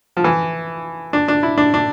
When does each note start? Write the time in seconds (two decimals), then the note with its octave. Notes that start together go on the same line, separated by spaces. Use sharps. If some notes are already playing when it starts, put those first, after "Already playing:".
0.17 F3
0.24 E3
1.13 D4
1.28 D4
1.43 E4
1.58 D4
1.74 D4